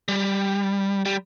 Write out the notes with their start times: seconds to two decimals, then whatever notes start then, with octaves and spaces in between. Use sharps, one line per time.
0.08 G3
1.06 G3